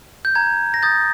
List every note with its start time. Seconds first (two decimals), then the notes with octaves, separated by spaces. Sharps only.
0.25 G6
0.35 A#5 G#6
0.74 A#6
0.83 D#6 G6 A6